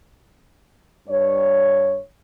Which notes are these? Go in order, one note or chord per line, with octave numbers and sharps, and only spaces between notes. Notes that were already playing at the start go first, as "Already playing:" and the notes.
G2 C#5